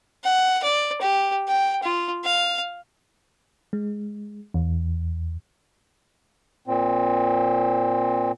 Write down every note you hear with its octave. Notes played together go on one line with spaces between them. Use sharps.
F#5
D5
G4
G5
F4
F5
G#3
E2
A#2 C4